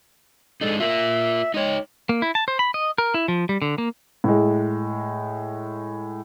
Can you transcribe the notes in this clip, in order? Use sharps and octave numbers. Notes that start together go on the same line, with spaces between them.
G#3 D4 D#4 A4
F4 A#4 E5
G#3 D#4 C#5
A#3
E4
A5
C5
B5
D#5
A#4
E4
F3
G3
D3
A#3
A2 G#3